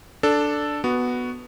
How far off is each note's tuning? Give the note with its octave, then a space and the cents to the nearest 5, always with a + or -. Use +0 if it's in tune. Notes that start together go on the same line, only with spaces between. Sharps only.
D4 +0 A4 +0
B3 +0 F#4 +0